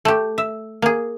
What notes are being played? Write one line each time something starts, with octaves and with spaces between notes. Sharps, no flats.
A3 G4
E5
A#3 G#4